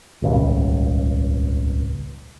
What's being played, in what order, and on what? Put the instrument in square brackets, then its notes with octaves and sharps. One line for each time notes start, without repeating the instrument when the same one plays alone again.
[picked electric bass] D#1 G#1 C#2